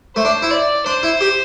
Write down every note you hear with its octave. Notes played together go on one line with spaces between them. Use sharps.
A3 C5
D4
E4
D5
D4 C5
E4
G4